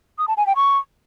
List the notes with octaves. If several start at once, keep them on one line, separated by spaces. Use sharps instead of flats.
D#6
A5
G#5
G5
C#6